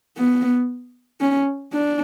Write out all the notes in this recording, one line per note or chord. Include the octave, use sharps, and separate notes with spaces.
B3
C#4
D4